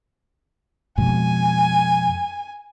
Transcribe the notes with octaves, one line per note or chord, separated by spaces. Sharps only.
F2 B2 G#3 G#5